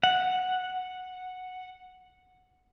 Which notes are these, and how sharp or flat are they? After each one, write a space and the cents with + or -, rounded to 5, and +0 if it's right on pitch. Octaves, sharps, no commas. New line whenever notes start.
F#5 -5